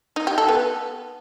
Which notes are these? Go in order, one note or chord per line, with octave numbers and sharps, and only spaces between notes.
D#4
G4
A4
B3